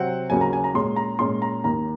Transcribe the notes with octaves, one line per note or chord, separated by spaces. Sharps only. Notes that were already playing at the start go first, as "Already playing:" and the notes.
Already playing: C3 F#3 C4 F#5
D#2 C#3 F#3 A#3 C#4 G#5
A#5
G#5
A#5
A#2 G#3 C#4 C6
A#5
A#2 G#3 C#4 C6
A#5
D#2 D#3 A#3 A#5